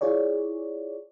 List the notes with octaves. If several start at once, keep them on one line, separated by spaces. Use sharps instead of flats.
E4 F4 G#4 C#5 D5